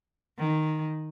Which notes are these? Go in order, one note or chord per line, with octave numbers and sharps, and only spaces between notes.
D#3